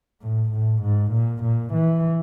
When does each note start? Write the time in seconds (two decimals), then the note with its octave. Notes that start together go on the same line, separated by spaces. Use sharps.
0.21 A2
0.51 A2
0.82 G#2
1.12 A#2
1.43 A#2
1.73 E3